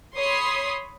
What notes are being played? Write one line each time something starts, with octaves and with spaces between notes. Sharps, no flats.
C#5 B5 C6 D#6 C7